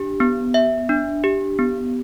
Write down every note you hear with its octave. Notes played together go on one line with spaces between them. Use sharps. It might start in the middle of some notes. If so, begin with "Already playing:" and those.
Already playing: D4 G4
B3
E5
D4
G4
B3